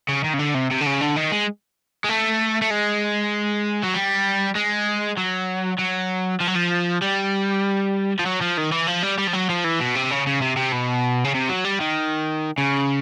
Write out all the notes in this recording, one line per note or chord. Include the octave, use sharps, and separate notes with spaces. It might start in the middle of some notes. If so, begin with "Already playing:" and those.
C#3
D#3
C#3
D3
C3
C3
D3
C#3
D3
D#3
G#3
G#3
A3
A3
G#3
F#3
G3
G#3
F#3
F#3
F3
F#3
F3
G3
F3
F#3
F3
D#3
E3
F3
G3
G3
F3
F#3
F3
E3
B2
C3
C#3
C#3
C3
C3
B2
C#3
C3
F#3
G3
D#3
C#3